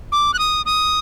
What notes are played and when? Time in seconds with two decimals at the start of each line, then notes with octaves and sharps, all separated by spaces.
0.12 D6
0.34 F#6
0.39 D#6
0.66 D#6